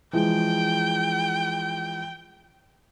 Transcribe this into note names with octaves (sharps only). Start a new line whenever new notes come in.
E3 F3 G#3 G5